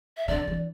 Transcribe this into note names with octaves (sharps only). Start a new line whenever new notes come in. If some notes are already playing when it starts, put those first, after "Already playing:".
E5
D3 D5
E3